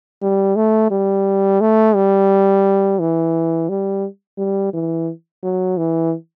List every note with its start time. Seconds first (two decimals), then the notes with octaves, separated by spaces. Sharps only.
0.22 G3
0.56 A3
0.91 G3
1.61 A3
1.95 G3
2.99 E3
3.69 G3
4.38 G3
4.74 E3
5.43 F#3
5.78 E3